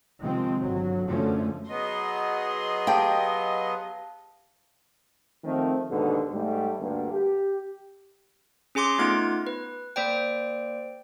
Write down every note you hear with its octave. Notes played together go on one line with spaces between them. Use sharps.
C3 D#3 F3 G#3 C4
G1 F#3
F#2 D3 F3 A3 C#4
F#3 B3 G#4 D#5 C6
G4 F5 G5 A5
D#3 F3 A3 C4
D#2 G#2 B2 D3
G#2 G3 A3
D2 G2 D3 A#3
G4
C#4 G#4 G#5 C6 D6
A3 B3 D#4 F4 G#6
B4
A#3 C5 D5 G5